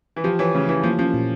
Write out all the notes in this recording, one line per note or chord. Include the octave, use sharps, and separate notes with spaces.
E3
F3 G4
E3 C#5
C#3 A3
E3 E4
F3 A#3
F3 C#4
A#2